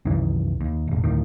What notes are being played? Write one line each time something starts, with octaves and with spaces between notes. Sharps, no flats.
C2 F#2 D#3 E3
D#2
E1 A1
D1 A2 D#3